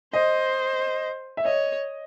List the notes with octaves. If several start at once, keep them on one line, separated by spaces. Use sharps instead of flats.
C5 D#5
E5
C#5 D#5